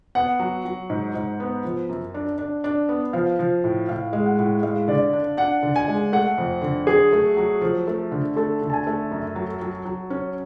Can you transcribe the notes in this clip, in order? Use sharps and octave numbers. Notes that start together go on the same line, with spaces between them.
B3 F#5
F#3
F#3
G#2
G#2
B3
F3
F#2
D4
D4
D4
B3
F3 F5
F3
A2
A2 F5
G#3
F#5
A2
G#3 F5
D3 D5
D4
D4 F#5
D3
G#5
G#3
A3 F#5
F2
D3
F#3 G#4
A3
F#3
F3
A3
D3
A3 A4
D3
A5
G#5
A3
F#2
F#3
F#3
F#3
C#4